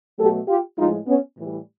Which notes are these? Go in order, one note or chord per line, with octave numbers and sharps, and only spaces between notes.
B2 F#3 A3 G4 A4
F4 G4
A2 F3 G#3 D#4 F4
B3 C#4
A2 E3 G3